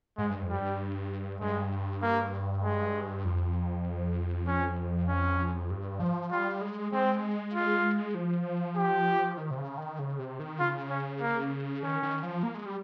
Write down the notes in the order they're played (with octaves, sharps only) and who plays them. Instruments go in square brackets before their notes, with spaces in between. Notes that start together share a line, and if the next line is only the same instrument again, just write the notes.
[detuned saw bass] G#2 [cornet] G#3
[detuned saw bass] G2
F2
[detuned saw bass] G2 [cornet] G3
[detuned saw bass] G2 [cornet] G#3
[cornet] A#3
G#3
[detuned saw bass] F2
[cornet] C#4
C#4
[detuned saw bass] G2
F3
[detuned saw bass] G3 [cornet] F4
[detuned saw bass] G#3
[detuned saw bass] G#3 [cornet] C4
[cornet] F4
[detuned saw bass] F3
[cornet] G4
[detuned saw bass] D#3
C3
C#3
D#3
C#3
C3
D#3
[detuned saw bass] C#3 [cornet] F4
[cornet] C#4
A#3
[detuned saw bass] D#3 [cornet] C#4
[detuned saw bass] D#3
F3
A#3
G#3
G3